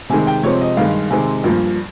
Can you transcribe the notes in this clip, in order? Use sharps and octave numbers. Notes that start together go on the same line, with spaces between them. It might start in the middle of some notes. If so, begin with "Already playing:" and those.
C3 D#3 G#3 G#5
G5
C3 F3 G#3 C4 C#5
D#5
G2 D#3 G#3 F5
C3 D#3 G#3 C4 G#5
G2 F3 A#3